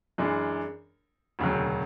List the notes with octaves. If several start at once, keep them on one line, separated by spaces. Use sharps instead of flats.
F#2 E3 G#3 D4
E1 D2 C#3 F#3